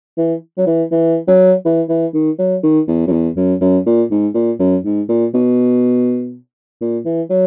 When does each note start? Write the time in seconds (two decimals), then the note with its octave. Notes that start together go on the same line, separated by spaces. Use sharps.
0.17 E3
0.58 F#3
0.66 E3
0.92 E3
1.28 F#3
1.65 E3
1.89 E3
2.14 D#3
2.39 F#3
2.63 D#3
2.88 E2
3.07 F#2
3.12 E2
3.37 F#2
3.61 F#2
3.86 A#2
4.11 G#2
4.35 A#2
4.59 F#2
4.85 G#2
5.09 A#2
5.34 B2
6.81 A#2
7.05 E3
7.30 F#3